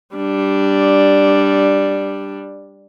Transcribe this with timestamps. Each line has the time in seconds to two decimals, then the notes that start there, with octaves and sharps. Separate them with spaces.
0.15 G3 D4